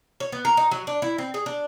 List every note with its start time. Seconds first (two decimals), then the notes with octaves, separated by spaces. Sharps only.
0.20 C#5
0.32 B3
0.45 A#4
0.57 D#4
0.71 F#3
0.87 D4
1.02 E4
1.18 C4
1.34 G#4
1.46 D4